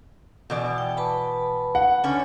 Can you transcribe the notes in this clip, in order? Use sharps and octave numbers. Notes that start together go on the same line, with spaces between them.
B2 E3 D5
G5
B4 A5 B5
F#5
D3 C#4 C#5 G#5